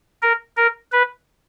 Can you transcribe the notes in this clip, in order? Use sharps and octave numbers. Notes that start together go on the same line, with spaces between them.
A#4
A#4
B4